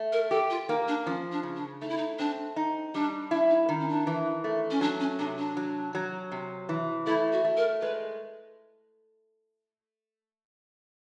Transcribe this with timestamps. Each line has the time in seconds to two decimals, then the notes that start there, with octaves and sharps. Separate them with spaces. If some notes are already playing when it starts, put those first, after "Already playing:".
Already playing: A3
0.12 A#4
0.31 G4 A4
0.50 F4
0.68 A#3 D#4
0.88 D4
1.06 F3 C#4
1.32 D4
1.43 C#3
1.56 D4
1.81 A3 D#4
1.89 E4
1.97 D#4
2.19 C4 D4
2.56 D#4
2.94 G3 D4
3.31 D4 E4
3.50 D#4
3.69 D#3 D4
3.80 C#4
3.88 D4
4.07 E3
4.44 A3
4.71 C#4
4.81 F#3 D4
5.00 C#4
5.19 C3 D4
5.38 D4
5.57 F#3
5.95 F#3
6.32 C3
6.69 E3
7.06 A3 E4
7.32 F#4
7.45 A3
7.57 A#4
7.81 G#3 B4